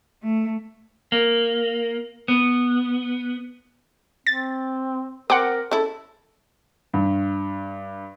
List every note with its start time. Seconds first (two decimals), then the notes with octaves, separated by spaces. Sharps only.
0.23 A3
1.12 A#3
2.28 B3
4.27 C4 A6
5.30 C4 A#4 F#5 D6
5.71 C#3 E4 A4
6.94 G2